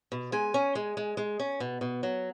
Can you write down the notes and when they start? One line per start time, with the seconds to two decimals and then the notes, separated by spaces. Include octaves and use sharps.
0.12 B2
0.32 G#3 G#5
0.54 C#4
0.75 G#3
0.97 G#3
1.17 G#3
1.40 C#4
1.60 B2
1.81 B2
2.03 F#3